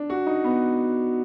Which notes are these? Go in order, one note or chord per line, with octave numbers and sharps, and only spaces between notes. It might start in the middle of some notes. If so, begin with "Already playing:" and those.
Already playing: D4
F#4
D#4
B3